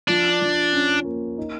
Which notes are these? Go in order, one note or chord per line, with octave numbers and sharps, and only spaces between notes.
F3 D4
F3
C#4
A#3
D#4